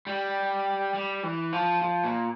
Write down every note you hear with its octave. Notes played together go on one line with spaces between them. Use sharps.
G3
G3
E3
F3
F3
A#2